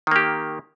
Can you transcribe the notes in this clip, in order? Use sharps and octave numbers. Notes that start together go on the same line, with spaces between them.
D#3 A#3 G4